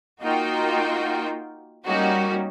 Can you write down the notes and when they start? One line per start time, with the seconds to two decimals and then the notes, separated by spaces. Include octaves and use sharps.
0.21 A#3 D#4 F4 F#4 G5
1.86 G3 A#3 C#4 D#4 F#4 G4